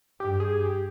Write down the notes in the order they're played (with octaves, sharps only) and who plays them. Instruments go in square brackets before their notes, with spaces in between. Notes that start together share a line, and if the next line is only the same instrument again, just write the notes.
[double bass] G2 [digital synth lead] G4
[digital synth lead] G#4
G4